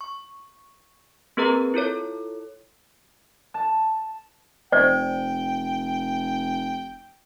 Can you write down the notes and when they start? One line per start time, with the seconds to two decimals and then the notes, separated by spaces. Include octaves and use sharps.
0.01 C#6
1.37 A#3 C4 G#4 A#4 B4 A#5
1.74 E4 F4 A4 C#5
3.54 A5
4.72 F1 C5 D5 G5